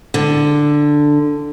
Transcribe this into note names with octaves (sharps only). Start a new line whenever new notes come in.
D3